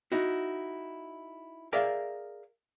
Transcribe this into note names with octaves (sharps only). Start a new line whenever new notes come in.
D#4 E4 F#4
G#4 A#4 D5 E5 F5